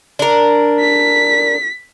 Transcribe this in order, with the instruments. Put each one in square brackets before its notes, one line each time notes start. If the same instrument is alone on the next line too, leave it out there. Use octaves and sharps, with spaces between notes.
[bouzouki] D4 A#4
[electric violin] B6